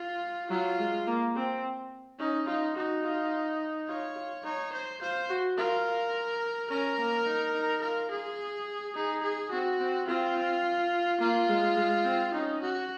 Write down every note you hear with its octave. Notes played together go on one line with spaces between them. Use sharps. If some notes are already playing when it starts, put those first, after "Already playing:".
Already playing: F4
F#3 F4
G#3
A#3
C4
C#4 D#4
D#4 F4
D#4 F#4
F4
F4 C#5
F4
D#4 C#5
C5
F4 C5
F#4
F4 A#4
C#4 A#4
A#3
D#4
D#4
F4 A#4
G#4
D#4 G#4
G#4
C4 F#4
C4
C4 F4
A#3 F4
G#3
G#3
C4
C#4 D#4
F#4